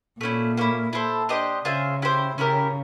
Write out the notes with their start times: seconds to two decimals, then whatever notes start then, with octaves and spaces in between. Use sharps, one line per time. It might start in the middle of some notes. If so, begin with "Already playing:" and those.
0.20 A#2 A3 C#4 E4
0.57 A#3 C#4 E4
0.93 E4 A4 C5
1.29 D4 G4 C5 D#5
1.65 C#3 F4 G#4 C5 E5
2.02 E4 G4 C5
2.38 C#3 C#4 E4 G4 A#4